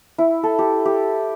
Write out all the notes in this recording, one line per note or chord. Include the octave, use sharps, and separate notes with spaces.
E4
A4
G4
G4